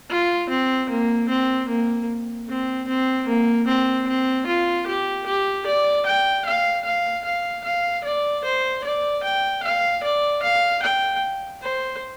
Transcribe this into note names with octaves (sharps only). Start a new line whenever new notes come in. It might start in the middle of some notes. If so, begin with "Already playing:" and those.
F4
C4
A#3
C4
A#3
C4
C4
A#3
C4
C4
F4
G4
G4
D5
G5
F5
F5
F5
F5
D5
C5
D5
G5
F5
D5
F5
G5
C5